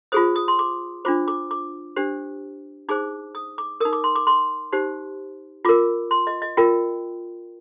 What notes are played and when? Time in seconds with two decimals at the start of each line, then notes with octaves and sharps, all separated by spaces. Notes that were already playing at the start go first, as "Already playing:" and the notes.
0.12 F4 G#4 C5 D#6
0.36 D#6
0.48 C6
0.59 D6
1.05 D4 F4 C5 D6
1.28 D6
1.51 D6
1.96 D4 G4 C5
2.89 D#4 G#4 C5 D6
3.35 D#6
3.58 D6
3.80 A#4 D#6
3.85 D#4
3.93 D6
4.04 C6
4.16 D6
4.27 C6
4.73 D#4 G4 C5
5.65 F4 A#4 D6
6.11 C6
6.27 D#5
6.42 D#5
6.57 F4 A#4 G5